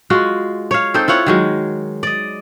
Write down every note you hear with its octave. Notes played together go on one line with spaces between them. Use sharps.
G#3 F4 F#4
C#5 F5
C4 D#4 A4 C5
E4 F4 C#5 F#5
D#3 F#3 G#3
D5 D#5